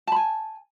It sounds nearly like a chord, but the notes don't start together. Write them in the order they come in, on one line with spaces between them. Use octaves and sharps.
A5 B5 G#5